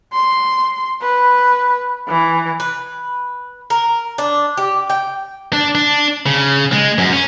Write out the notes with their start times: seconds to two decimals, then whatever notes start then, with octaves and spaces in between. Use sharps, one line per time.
0.13 C6
1.01 B4
2.08 E3
2.60 B4
3.70 A#4
4.18 D4
4.57 G4
4.90 G5
5.53 D4
5.75 D4
6.26 C#3
6.72 G#3
6.98 F#2
7.13 C#4